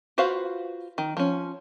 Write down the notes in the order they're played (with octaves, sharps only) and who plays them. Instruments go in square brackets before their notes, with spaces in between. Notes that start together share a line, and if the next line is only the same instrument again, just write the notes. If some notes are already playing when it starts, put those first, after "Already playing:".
[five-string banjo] F4 F#4 B4 C5 F5
D#3
F3 C#4